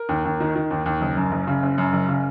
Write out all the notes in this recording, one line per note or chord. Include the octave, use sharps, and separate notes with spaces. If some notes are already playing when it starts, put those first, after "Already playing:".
Already playing: A#4
D#2
D#2
D#3
D#3
D#2
D#2
F#1
F#2
F#1
C#3
F#1
F#2
F#1
C#3